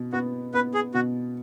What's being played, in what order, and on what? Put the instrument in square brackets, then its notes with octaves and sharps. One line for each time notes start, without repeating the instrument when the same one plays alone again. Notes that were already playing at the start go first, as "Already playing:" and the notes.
Already playing: [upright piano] B2
[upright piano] B3 [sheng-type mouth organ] F#4
[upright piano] B3 [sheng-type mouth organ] B4
[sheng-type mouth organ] G#4
[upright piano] B2 [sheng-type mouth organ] F#4